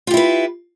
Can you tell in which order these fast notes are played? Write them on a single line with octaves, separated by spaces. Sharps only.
F4 G4 E4 B4